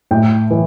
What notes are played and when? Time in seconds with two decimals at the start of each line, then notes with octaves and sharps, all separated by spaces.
0.11 A2 G5
0.51 E3